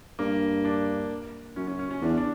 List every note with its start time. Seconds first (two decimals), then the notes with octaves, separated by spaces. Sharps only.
0.19 G2 A#3
0.65 D4
1.56 F#2 C#4
1.68 C#4
1.79 C#4
1.91 C#4
2.02 E2 D4
2.17 D4